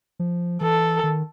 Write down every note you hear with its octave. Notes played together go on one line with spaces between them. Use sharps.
F3
E3 A4
D#3